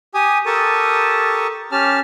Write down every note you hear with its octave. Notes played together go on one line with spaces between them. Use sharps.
G4 G#5 D#6
G4 A4 A#4 A5 C#6 D#6
C#4 G4 A5 F6